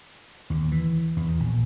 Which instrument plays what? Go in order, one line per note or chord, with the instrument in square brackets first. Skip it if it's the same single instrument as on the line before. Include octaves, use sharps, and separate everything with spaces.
[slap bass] D#2
E3
E2
A#1